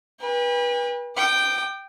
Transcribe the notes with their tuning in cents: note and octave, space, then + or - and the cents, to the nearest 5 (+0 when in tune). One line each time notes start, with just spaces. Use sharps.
B4 -30 G5 +45
G5 -5 D6 +40